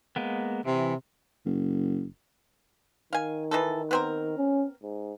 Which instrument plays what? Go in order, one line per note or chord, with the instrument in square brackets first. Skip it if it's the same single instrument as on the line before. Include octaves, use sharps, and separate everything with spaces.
[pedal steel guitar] G#3 A#3 B3
[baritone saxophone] C3 [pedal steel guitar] E3
[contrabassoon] F#1
[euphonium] D#3 [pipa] F5 G#5
[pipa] E3 D#4 A4
B3 C4 A#4
[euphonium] C#4
G#2